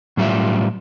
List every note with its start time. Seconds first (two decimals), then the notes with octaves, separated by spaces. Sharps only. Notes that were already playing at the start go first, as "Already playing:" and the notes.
0.17 A2 F#3 G3 C#4 F4 E5